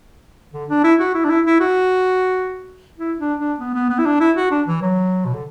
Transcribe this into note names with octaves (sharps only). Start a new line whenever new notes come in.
D3
D4
E4
F#4
E4
D4
E4
E4
F#4
E4
D4
D4
B3
B3
B3
E4
D4
E4
F#4
D4
E3
F#3
B2
D3